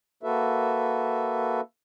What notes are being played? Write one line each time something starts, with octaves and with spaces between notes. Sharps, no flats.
A#3 F#4 A4 B4 E5